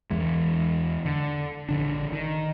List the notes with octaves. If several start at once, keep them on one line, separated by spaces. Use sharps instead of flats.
E2 E3 G#3
D3
A#1 D3 D4
D#3